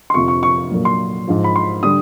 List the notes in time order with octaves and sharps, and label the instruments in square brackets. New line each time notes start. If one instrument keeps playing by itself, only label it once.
[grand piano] C6
F2 C3 F3 C#6
C#6
C#6
A#2 F#3
C6
G#2 F3
B5
C6
D3 G3 D#6